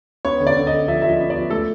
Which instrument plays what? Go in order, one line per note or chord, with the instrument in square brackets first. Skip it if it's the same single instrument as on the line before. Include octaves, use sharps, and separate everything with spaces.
[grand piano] B3 C#5
D3
D5
D3
D#5
D3
F3 E5
F3 E5
D#5
B3
D5
F3
A3 A4